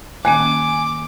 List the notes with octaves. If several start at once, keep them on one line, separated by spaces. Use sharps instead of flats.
D#3 A#3 C#4 G#5 D6